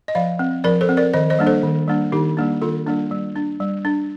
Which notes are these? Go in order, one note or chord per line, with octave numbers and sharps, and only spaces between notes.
D#5
F3 D5 F5
C4
F3 A#4 D5
A4 C5
C4
A#4 D5
D#3 C5 D#5
C5 D#5
G3 A#3 D4
A4 C5
D#3
G3 A#3 D4
D#3 D#4 G4
G3 A#3 D4
D#3 F4 A4
G3 A#3 D4
G3
D4
G3
D4